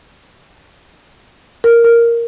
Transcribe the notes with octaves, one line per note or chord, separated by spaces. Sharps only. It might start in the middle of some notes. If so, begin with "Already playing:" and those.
A#4
A#4